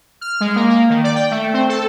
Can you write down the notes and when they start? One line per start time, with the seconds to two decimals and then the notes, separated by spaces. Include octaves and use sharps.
0.21 F6
0.40 G#3
0.56 A#3
0.70 A#3
0.90 D#3
1.04 D5
1.15 G5
1.31 A3
1.54 C4
1.69 A4